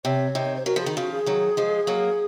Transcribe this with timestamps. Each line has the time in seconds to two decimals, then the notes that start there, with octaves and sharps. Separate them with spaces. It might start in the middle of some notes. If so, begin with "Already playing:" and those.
0.04 C3 C#5
0.35 C3 D#3
0.56 C5
0.66 F#3 A#4
0.76 F3
0.81 G#4
0.86 D#3
0.96 C#3 F3 F#4
1.11 G#4
1.26 D#3 F#3
1.57 F3 G#3
1.87 F#3 A#3